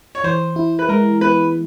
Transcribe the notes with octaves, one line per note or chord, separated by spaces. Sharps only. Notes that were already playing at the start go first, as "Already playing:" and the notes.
C#5
E3 C5
E4
B4
G#3 A#4
B3 B4